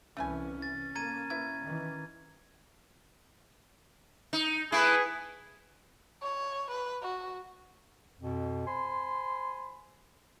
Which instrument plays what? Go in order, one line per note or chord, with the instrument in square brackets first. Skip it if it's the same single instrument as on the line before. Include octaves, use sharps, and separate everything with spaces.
[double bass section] C2 E3 [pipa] A3 B4 G#5 [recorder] C#4
[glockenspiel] A6
[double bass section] A#3 [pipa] A4 [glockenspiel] A#5 G#6 D#7
[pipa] E4 B4 [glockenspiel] G#6
[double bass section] D#3 E3
[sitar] D#4
[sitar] A3 E4 [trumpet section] G#4 B4
[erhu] C#5
B4
F#4
[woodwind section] F2 B2
C5 G#5 B5 C6